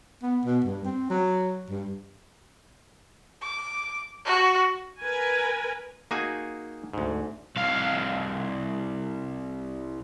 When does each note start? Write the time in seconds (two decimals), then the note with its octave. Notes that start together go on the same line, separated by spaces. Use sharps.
0.23 B3
0.45 B2
0.64 G2
0.85 C4
1.10 F#3
1.70 G2
3.43 D6
4.25 F#4
5.02 A#4 B4 G#5
6.11 A#3 D#4 F#4 G#4 G#5
6.93 D2 G#2
7.56 C2 F5